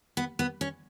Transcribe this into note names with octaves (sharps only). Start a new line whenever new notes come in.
B3
B3
C#4